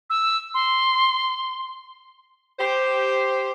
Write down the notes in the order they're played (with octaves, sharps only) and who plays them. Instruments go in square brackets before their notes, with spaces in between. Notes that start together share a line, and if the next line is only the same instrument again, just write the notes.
[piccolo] E6
C6
[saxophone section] G4 C5